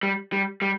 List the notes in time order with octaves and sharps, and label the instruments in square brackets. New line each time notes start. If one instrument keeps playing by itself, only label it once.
[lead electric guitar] G3
G3
G3